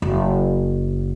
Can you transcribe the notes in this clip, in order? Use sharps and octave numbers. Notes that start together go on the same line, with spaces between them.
F#1